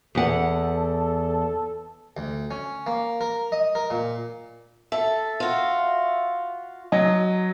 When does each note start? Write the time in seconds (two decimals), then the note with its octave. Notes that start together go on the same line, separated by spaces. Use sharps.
0.15 E2 A4 F#5
2.17 D2
2.51 C#4
2.87 A#3
3.21 A#4
3.52 D#5
3.75 A#4
3.90 A#2
4.92 A4 E5
5.40 F4 F#4
6.92 F#3 D#5